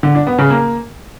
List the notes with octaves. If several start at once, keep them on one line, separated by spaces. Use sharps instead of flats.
D3
D4
B3
C#3
A#3